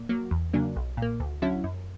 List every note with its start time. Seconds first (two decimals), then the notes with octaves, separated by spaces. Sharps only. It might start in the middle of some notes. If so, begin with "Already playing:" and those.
Already playing: A#2
0.09 F#3 A#3
0.31 E2
0.53 C#3 F#3 A#3 D4
0.76 B1
0.97 A#2 A#3
1.20 D2
1.42 D3 F#3 C#4 E4
1.64 F#2